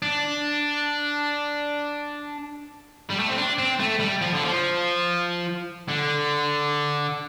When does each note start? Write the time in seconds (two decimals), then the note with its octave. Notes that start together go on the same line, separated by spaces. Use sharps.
0.02 D4
3.10 G3
3.20 A3
3.29 C4
3.38 D4
3.58 C4
3.80 A3
4.00 G3
4.22 F3
4.33 D3
4.44 F3
5.89 D3